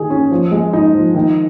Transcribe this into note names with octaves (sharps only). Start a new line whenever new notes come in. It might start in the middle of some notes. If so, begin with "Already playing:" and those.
Already playing: D#3 G#4
C#4
F3
G#3
D#4
F3
D#3